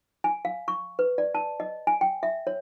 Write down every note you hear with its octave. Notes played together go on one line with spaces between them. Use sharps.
G#5
F5
C#6
B4
D5
A5
D#5
G#5
G5
E5
C#5